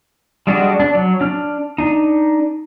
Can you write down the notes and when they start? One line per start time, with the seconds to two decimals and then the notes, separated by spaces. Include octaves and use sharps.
0.47 G3 G#3 D4 F#4
0.80 D4
0.95 F#3
1.21 D4 F6
1.78 D4 D#4